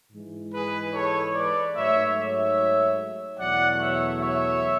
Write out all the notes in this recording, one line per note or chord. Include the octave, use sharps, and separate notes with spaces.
G#2 E3 G#3
G#4 B4
A4 C#5
B4 D5
G#2 F#3 A3 C#5 E5
C#5 E5
E2 B2 F#3 A3 D5 F#5
C#5 E5
C#5 E5